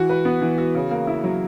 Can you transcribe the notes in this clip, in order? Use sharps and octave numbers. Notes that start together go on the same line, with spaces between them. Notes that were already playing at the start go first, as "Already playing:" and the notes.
Already playing: E3 F#4
B4
B3
E3
F#4
C#3
A#3
E4
F#3